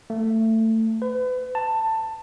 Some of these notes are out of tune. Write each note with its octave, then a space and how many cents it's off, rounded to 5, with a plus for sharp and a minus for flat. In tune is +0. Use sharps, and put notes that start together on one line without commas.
A3 +20
B4 +35
A5 +15